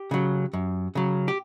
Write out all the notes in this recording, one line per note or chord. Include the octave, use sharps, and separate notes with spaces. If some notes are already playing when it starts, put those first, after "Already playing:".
Already playing: G4
C#3 F#3
F#2
C#3 F#3
G4